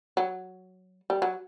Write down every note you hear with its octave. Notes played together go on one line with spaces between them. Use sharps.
F#3
G3
F#3